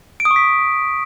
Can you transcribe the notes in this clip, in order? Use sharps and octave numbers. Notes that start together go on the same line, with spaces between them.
D7
D#6
C#6
B6